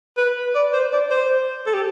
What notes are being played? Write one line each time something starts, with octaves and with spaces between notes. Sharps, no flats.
B4
D5
C5
D5
C5
A4
G4